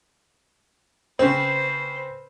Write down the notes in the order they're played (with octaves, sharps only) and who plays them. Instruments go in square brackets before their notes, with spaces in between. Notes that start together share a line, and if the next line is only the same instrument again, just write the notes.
[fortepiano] C#3 C4 [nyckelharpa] B4 C5